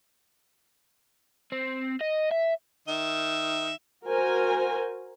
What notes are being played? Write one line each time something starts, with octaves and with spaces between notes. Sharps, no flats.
C4
D#5
E5
D#3 E5
F#4 A#4 C5 G#5